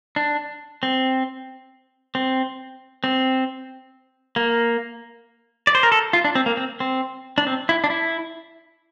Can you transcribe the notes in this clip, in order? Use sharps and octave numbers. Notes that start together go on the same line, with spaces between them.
D4
C4
C4
C4
A#3
D5
C5
A#4
A4
F4
D4
C4
A#3
C4
C4
D4
C4
E4
D4
E4